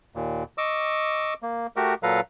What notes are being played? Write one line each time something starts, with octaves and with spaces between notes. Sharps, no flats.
D#2 A#2
D#5 C#6 D6 E6
A#3
A3 F#4 G4 A#4
A#2 F#3 A4 B4 F5 A#5